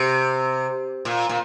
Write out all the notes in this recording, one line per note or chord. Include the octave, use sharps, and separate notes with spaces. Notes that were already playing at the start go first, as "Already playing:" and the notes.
Already playing: C3
A#2
A#2